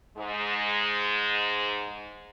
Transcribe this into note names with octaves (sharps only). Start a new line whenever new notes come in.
G#2 G#3